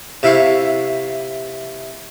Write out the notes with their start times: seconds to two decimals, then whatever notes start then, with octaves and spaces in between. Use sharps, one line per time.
0.23 C3 E4 F5 C#6